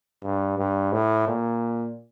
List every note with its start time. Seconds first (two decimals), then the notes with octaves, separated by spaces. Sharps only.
0.23 G2
0.58 G2
0.92 A2
1.27 A#2